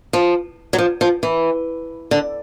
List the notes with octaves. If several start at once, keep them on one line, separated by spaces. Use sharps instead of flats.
F3
F#3
F3
F3
E3
D3